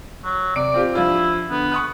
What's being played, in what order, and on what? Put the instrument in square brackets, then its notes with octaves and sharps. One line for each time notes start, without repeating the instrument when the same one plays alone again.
[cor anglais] F#3
[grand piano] C3 D7 [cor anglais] D5
[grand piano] C4 F4 G4
[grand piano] F3 D4 F4 [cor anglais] E4
[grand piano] D3 [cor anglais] B3
[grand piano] C#6 D#6 F#6